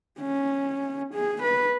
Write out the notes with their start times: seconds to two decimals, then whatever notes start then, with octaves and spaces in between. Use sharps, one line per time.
0.20 C#4
1.14 G#4
1.43 B4